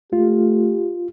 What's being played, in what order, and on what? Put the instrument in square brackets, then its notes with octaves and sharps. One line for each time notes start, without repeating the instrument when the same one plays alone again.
[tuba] A3 [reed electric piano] F4 [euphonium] G4